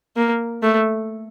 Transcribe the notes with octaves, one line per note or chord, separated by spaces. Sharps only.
A#3
A3